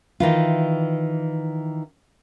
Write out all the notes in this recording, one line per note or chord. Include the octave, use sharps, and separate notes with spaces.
D#3 E3 F4